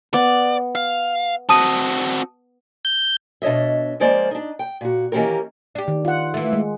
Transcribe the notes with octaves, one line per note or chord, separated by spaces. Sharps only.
B3 D5
F5
C4 F#4 A5 D#6 D#7
G6
B2 D4 C#5 D#5 E5
F3 G#3 A#3 C#4 C5 D5
D4 D#4
G5
A#2 F#4
D#3 E3 A#3 C#4 G4 A#4
D4 G4
D#3
F4 F#5
E3 A3
G#3